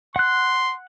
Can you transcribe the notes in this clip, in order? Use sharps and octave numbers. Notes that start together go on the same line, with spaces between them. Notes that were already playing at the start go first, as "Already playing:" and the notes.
F#5 C6 F#6